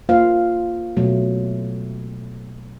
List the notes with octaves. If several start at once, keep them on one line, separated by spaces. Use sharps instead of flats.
A#3 F4 C5 F5
B2 F#3 A3